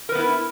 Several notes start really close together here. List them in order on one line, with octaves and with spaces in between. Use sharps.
A#4 B4 B3 E4